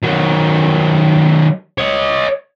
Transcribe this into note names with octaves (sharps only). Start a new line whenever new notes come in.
D#3 F#3
C#5 D#5